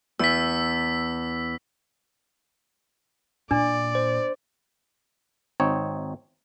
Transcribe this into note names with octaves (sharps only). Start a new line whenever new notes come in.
E2 E6 B6
A#2 D4 D5
C5
G#1 C4 D#4 C#5